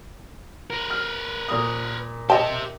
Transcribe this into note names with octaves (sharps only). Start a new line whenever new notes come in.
A#4 B4
F6
A#2 D#6
G4 D#5 E5 G5 A5